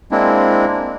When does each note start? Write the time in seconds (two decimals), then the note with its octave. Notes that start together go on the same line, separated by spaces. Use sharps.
0.11 G#3 A#3 C4 D4 E4